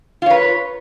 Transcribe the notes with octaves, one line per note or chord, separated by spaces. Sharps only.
F4 B4 C#5